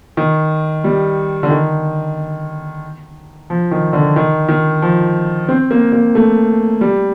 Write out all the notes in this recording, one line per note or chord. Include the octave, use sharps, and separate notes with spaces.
D#3
G3
D3
D#3
F3
D#3
D3
D#3
D#3
F3
C4
A#3
A#3
A3
G3